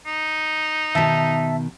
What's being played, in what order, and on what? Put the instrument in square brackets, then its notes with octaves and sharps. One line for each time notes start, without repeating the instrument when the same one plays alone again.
[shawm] D#4
[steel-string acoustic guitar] B2 D#3 [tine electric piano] E5 A5 B6